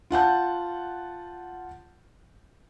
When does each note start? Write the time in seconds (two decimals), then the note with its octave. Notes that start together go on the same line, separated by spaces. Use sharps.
0.11 F4 F#5 A5 G6